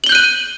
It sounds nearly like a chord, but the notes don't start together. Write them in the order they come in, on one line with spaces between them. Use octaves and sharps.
F#7 G7 G6 F#6 D#7